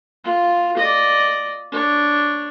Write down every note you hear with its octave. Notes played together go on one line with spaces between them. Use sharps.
F4
D5 D#5
D4 C#5